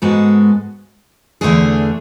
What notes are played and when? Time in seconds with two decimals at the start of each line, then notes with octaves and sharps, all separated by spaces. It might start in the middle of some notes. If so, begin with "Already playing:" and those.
0.02 G#2 G#3 B3 F#4 A4
1.41 E2 D3 A3 D4 G#4